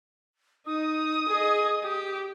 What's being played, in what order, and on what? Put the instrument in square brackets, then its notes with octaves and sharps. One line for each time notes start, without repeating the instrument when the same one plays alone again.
[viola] D#4 [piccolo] D#6
[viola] G#4 D#5
G4